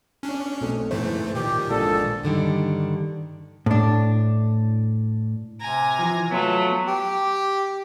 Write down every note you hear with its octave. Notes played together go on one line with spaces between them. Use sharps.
C#4 D4
B1 A3 C4
G#2 E3 A3 E4 C5
A#2 D#3 G4
A#1 G#3 A4 D5
G2 D3 D#3 G3
A2 D4
C3 G#5 A#5
E3 F3
F#3 A3 B3 F4
G4